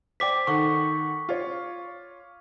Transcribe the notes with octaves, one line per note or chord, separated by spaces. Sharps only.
C5 D5 G5 D6 B6
D#3 A4 F#5 C#6
F4 C#5